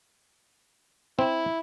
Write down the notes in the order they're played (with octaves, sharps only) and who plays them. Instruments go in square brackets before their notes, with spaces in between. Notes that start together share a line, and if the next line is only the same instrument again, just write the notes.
[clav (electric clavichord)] C4 [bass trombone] E4